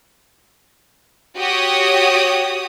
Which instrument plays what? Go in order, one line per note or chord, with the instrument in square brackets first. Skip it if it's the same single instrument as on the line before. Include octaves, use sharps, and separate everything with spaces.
[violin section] F#4 G4 C#5 D#6